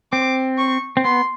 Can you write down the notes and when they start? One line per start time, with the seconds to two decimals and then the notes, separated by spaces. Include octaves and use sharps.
0.12 C4 D6
0.58 C#6
0.97 C4
1.04 B3 C6